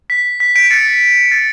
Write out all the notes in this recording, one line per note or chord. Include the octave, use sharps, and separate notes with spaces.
B6
B6
B6 D7
A6 C#7
A6